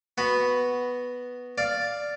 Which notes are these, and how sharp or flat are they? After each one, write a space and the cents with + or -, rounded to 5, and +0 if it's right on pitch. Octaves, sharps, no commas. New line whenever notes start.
B3 +0 F#4 +0 B5 +0
D5 +0 F5 +0